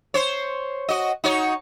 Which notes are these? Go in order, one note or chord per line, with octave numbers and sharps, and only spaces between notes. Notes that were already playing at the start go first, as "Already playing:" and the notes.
C5 C#5
F#4 D#5
D#4 F#4 C#5